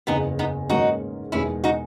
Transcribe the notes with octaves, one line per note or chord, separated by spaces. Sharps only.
F#1 E2 C#3 B3 D#4
B3 D#4
G#2 D#3 A#3 C#4 D#4 F#4
E1 E2 D#3 G#3 C#4 E4
D#4 F#4